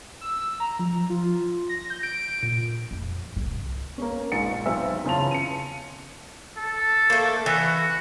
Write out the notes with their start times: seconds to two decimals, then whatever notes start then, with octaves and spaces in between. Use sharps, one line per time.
0.21 E6
0.60 A#5
0.79 F3
1.10 F4
1.69 A#6
1.90 G6
2.03 D7
2.43 A#2
2.91 F2
3.36 C2 D#3
3.98 A#3 C#4
4.32 A#1 G#2 D#3 A6 C#7
4.66 B1 C4 E5 E6
5.05 E2 C#3 F4 A5 F7
5.31 C#7 D#7
6.57 A4
7.10 A3 A#3
7.46 E3 F#4